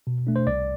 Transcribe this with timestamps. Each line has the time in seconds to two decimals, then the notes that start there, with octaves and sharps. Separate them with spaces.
0.07 B2
0.27 A3 D4
0.36 C5
0.47 C2 D5